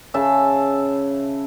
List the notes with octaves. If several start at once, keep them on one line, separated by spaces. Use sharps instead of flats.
C#3 E5 A5